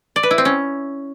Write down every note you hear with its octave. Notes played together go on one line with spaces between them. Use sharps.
D5
B4
E4
C4
C#4